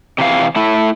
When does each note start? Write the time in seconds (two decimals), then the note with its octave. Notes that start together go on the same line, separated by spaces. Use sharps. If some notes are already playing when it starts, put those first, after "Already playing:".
0.18 C3 E3 F5
0.56 A3 E4